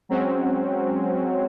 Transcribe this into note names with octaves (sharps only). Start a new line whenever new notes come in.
F#3 G#3 C4 C#4 F#4